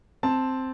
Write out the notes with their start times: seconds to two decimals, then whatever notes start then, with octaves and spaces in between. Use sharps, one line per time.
0.23 C4 A5